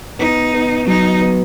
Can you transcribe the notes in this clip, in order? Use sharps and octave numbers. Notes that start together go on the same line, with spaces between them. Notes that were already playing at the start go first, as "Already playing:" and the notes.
B3 D#4
B3
F#3 D#4
B3